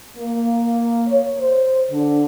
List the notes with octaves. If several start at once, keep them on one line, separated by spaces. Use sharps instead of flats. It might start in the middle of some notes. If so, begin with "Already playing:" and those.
A#3
C#5
C5
D3